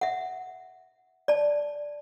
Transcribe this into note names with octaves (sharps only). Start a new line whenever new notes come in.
E5 F#5
D5 A5